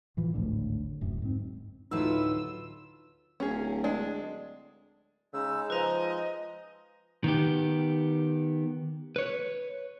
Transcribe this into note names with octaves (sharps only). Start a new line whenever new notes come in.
A2 E3 F3
G#1 D2 A2 D3
D1 F#2
G#2 C4
D2 A2 F#3 D#4 F4 B4 E6
D1 C#4 G#4
G#3 D4
C#3 G#3 D#4 E6
F3 B4 D#5 A#5
D#3 B3 G4
B4 C#5